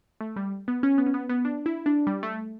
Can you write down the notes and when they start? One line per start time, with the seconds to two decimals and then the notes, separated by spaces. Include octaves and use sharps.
0.21 A3
0.36 G3
0.68 B3
0.83 C#4
0.98 B3
1.06 C#4
1.14 B3
1.29 B3
1.45 D4
1.66 E4
1.86 D4
2.07 G3
2.23 A3